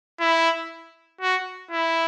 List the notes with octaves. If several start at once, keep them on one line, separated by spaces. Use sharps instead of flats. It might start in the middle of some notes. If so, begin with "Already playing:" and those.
E4
F#4
E4